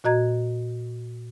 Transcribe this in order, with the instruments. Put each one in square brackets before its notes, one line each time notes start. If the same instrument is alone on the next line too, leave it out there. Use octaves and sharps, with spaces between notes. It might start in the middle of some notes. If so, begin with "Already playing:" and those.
[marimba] A#2 F#4 D#5 A#5 G#6